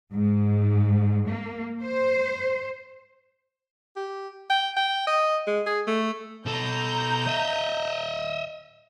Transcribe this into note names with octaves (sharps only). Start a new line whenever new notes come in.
G#2
A#3
C5
G4
G5
G5
D#5
G#3
G#4
A3
B2 A4 A#5 G6
D#5 E5